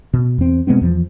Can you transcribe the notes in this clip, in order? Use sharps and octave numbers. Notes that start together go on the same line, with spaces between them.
B2
E2 C4
B2 G#3 B3 C4
E2 F3